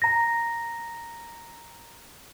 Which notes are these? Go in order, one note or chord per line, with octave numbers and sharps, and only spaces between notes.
A#5 A#6